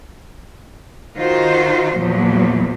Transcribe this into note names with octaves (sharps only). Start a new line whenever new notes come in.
D#3 D#4 F4 F#4 C5
E2 A#2 F3 F#3